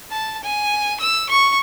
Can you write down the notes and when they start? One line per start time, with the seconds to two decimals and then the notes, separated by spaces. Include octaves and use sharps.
0.11 A5
0.43 G#5
1.00 E6
1.29 C#6